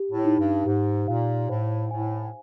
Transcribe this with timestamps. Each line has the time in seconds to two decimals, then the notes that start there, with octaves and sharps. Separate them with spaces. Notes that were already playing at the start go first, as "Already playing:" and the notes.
Already playing: G4
0.12 A2
0.25 D#4
0.39 G2
0.66 G#2 G4
1.08 A#2 F5
1.49 A2 C5
1.91 A2 G#5